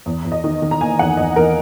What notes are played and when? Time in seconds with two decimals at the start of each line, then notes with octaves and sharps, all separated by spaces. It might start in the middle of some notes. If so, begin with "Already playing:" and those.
0.06 E2
0.25 E2
0.32 D#5
0.44 D#3
0.62 D#3
0.71 A#5
0.81 A#3 G#5
0.99 E2 F#5
1.17 E2 D#5
1.36 E2 A#4